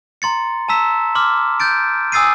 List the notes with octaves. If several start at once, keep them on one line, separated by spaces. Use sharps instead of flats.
A#5 C6 A6 C#7
A5 A#5 E6 B6 E7
C6 D6 F6
G6 A6 D7
G#5 D#6 E6 A6 C7 D#7